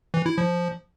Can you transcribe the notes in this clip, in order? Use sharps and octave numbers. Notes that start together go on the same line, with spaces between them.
E3
E4
F3